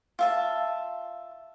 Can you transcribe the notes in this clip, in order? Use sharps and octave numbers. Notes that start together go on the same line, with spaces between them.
F4 E5 A5